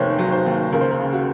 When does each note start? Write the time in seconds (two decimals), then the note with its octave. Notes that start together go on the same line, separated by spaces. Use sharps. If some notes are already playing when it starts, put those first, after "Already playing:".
Already playing: F1 D#2 D#3 A#4 C5 C#5
0.19 F#3
0.32 C5
0.46 D#2
0.72 C#2 A#4
0.81 C5
0.91 A#4
1.00 C#3
1.13 F#4